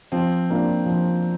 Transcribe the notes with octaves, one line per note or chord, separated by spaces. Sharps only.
F3 C4
A#3 D4 F4
F3